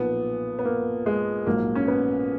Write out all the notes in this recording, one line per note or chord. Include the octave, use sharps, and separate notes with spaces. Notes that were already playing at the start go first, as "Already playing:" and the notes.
Already playing: B1 A#2 F3 B3
B3
A#3
G#3
A#1 G#2 F#3 A#3
C#4
B3